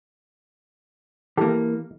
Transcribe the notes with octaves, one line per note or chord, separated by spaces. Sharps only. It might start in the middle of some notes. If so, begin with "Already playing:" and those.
E3 A#3 G4 A4